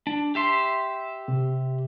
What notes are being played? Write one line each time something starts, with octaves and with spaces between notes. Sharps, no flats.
D4
G4 E5 C6
C3